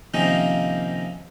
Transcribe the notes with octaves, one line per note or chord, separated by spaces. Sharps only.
C3 D#3 F3 A#3 C#4 D#4